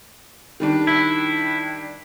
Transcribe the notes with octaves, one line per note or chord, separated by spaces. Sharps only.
D#3 G3 D4
E4